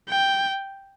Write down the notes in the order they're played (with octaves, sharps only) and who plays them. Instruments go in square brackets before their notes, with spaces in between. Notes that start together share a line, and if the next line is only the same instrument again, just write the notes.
[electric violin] G5